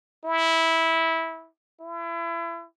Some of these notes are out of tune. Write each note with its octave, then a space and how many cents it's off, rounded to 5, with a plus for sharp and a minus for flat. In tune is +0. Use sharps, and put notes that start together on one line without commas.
E4 -15
E4 +35